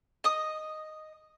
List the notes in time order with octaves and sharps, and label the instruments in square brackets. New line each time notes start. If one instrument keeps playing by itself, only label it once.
[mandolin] D#5 D#6